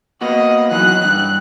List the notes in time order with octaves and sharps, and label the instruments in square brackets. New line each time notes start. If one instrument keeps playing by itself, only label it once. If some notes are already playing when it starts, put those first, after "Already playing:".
[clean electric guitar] A#3 B3 F#4 [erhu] D#5
[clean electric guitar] E3 F#3 D#4 [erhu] F#6
[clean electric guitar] G2